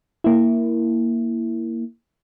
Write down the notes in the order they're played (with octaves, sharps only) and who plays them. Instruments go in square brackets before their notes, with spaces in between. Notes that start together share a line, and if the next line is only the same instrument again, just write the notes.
[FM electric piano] A#3 E4